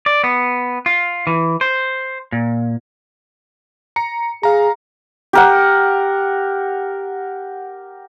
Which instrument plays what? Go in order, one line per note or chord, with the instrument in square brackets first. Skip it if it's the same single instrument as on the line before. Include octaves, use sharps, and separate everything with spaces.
[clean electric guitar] D5
B3
F4
E3
C5
A#2
[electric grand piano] A#5 C#7
[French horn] G#4 [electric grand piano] F5 A#5
[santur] G4 A#4 F#5